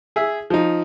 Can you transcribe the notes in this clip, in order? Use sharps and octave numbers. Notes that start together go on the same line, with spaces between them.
G#4 E5
F3 D#4